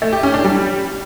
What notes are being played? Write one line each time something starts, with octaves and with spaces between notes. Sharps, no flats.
A3
G4
C#4
D4
G3